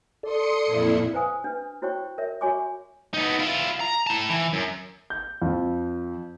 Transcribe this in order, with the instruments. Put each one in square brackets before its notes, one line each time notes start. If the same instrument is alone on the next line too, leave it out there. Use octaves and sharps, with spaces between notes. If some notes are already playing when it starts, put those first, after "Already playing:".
[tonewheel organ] A4 D5 [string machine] C6 D#6 C#7
[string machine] F2 A#2 E4
[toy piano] E4 B4 C5 F5 G#5 D#6
D4 B4
E4 F#4 C5 C#5 G5 C#6
A#4 C#5 E5
F#4 C#5 E5 G#5 C#6 D6
[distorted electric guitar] B3 D#4
E4 F4
A#5
E4 A5
E3
F#2
[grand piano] G6
F2